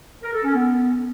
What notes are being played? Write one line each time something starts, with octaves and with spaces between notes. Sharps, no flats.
A#4
A4
C#4
B3